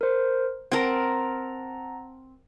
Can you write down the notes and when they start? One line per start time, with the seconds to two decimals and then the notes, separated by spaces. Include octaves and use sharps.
0.01 A#4 C5
0.72 C4 A#4 F#5 A5 A#5